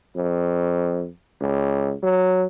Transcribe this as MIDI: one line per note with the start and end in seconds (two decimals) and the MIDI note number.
0.16 1.11 41
1.41 1.94 37
2.03 2.46 54